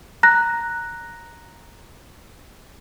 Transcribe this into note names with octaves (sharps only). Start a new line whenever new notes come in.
A#5 F#6 A#6